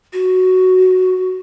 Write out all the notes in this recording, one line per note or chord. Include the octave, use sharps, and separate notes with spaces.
F#4